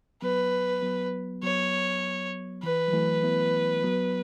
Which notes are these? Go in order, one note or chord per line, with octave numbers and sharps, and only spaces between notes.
F#3 B3 B4
F#3 B3
F#3 B3 C#5
E3 B4
F#3
E3 A3
B3 E4
F#3 B3